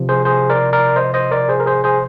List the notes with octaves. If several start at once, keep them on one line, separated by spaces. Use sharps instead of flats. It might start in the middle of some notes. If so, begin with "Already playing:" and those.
Already playing: C3 F3
G#4 C5
G#4 C5
A#4 D5
A#4 D5
C5 D#5
C5 D#5
A#4 D5
G#4 C5
A#4
G#4 C5
G#4 C5